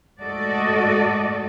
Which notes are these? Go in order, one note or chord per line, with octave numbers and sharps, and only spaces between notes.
G#2 A3 F#4 A4 D5 D#5